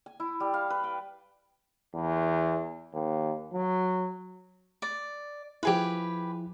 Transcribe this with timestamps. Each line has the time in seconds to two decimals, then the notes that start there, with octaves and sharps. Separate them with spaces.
0.06 G#5
0.20 E4
0.40 G3
0.54 F5
0.70 B4
0.84 G5
1.95 E2
2.93 D#2
3.53 F#3
4.82 D5
5.63 F3 E4 G4 G#4 B4